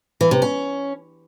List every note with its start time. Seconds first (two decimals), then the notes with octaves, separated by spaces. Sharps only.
0.21 E3
0.31 C3
0.42 C#4